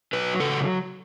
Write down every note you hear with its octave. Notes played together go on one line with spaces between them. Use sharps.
F#3 B4
C#3 A4